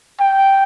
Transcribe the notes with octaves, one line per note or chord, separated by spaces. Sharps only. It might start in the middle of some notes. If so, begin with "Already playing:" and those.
G5